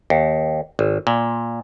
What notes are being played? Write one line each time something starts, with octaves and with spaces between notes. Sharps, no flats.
D#2
G#1
A#2